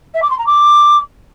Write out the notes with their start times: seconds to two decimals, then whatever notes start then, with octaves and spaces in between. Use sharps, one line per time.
0.14 E5
0.22 D6
0.30 C6
0.38 A#5
0.46 D6